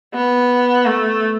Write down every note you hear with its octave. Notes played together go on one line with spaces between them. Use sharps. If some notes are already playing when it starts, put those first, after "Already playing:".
B3
A3